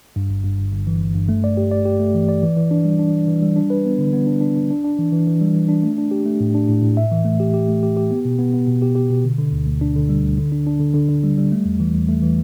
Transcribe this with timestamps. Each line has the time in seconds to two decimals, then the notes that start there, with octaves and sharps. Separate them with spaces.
0.16 G2
0.30 G1
0.44 G2
0.58 G1
0.72 G1
0.87 E3
1.01 G1
1.15 G2
1.29 A3
1.44 D5
1.57 G4
1.71 D5
1.85 G4
2.00 A3
2.15 E3
2.29 D5
2.43 E3
2.57 E3
2.71 D4
2.85 G3
2.99 D4
3.14 E3
3.28 E3
3.43 G3
3.56 D4
3.70 B4
3.85 B3
3.98 D3
4.13 B3
4.27 D4
4.41 D4
4.56 D4
4.70 D4
4.84 D4
4.99 E3
5.12 E3
5.27 E3
5.41 G3
5.55 E3
5.69 D4
5.83 A3
5.98 D4
6.11 G4
6.25 A3
6.40 A2
6.55 D4
6.68 A2
6.83 A2
6.97 E5
7.12 E3
7.25 A3
7.40 G4
7.54 G4
7.68 A3
7.83 G4
7.97 G4
8.11 B3
8.25 B2
8.39 B3
8.54 B3
8.68 B2
8.82 G4
8.95 G4
9.10 B2
9.24 D3
9.38 D3
9.52 D2
9.66 D2
9.81 D4
9.95 D3
10.09 G3
10.23 D2
10.38 D3
10.52 D4
10.67 D4
10.80 D3
10.94 D3
11.09 D3
11.23 G3
11.38 G3
11.52 A3
11.65 E2
11.80 E3
11.95 E2
12.08 A3
12.22 E3